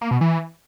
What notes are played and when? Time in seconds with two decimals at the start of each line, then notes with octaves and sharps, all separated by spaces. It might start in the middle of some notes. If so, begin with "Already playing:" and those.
0.01 A#3
0.11 B2
0.21 E3